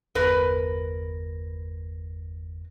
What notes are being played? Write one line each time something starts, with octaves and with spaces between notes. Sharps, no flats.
G1 E2 A#4 B4 A#6